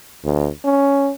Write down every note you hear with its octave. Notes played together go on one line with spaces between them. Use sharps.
D2
C#4